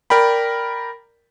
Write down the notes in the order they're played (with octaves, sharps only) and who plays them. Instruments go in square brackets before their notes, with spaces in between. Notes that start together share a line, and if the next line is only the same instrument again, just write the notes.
[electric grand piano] A#4 D5 G5 B5